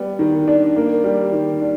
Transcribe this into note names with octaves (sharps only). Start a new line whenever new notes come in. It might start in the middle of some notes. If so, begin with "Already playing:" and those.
Already playing: G3 B3
D#3
D4
A#3
G3
D#3
D4